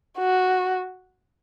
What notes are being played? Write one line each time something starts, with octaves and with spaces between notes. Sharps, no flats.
F#4